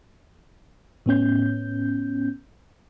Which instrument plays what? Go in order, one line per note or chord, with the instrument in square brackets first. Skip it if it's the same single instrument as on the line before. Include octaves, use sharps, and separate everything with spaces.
[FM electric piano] A2 B3 C#4 G6